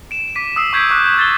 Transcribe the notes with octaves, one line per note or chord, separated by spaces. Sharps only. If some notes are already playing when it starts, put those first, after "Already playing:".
D7 E7
D6 B6 D#7
D#6 E6 C7
C#6 G6 G#6 B6 D7
C#6 D6 F#6 B6
G#6 A6 C7 G7